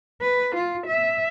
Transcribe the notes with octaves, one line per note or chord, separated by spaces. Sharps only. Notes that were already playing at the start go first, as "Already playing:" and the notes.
B4
F4
E5